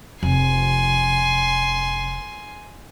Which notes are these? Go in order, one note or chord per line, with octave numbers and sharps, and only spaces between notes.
F1 G#5 C6